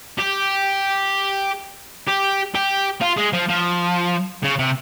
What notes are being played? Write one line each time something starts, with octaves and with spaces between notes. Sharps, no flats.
G4
G4
G4
F4
G#3
F3
F3
C#3
C3